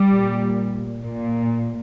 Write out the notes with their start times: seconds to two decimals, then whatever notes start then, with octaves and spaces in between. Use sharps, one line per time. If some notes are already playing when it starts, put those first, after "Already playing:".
Already playing: G3
0.09 A#2
1.03 A#2